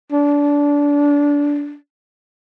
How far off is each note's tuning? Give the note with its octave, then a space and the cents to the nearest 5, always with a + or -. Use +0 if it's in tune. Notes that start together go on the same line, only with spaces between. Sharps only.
D4 -20